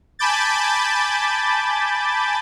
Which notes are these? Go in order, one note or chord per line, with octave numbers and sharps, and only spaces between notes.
G#5 A5 B5 D6 G6 A6